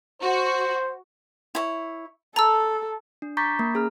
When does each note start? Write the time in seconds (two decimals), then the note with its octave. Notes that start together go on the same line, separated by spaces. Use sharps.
0.22 F#4 C5
1.55 E4 C#5
2.36 A4 A5 A#5 E6
3.22 D4
3.37 A#5 C#6 D6 G6 A6 B6
3.59 A#3
3.74 C#4 G#4 A#5 F6